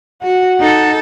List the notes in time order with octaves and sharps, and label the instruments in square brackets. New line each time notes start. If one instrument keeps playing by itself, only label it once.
[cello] F#4 [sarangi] F#5
[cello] D#4 A4